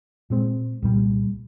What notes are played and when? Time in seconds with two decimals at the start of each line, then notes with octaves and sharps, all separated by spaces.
0.30 A#2 G#3 C4
0.82 C2 A#2 G3